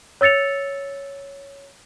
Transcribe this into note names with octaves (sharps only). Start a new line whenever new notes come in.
C#5 E6 A6 C#7 F7